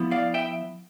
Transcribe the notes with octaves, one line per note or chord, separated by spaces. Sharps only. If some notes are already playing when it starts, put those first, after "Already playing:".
Already playing: F3 B3 E4
D5 F5
E5 G5